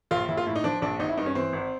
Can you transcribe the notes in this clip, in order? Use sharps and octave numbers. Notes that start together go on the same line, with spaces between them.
A#1 F4
A#1 E4
F4
A2 E4
D#4
F3 D4
A#1 D4
G#1 D#4
E4
G2 D#4
C#4
E3 C4
G#1